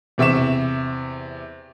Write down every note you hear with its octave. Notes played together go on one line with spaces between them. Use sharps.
E2 C3 E5 C#6 E7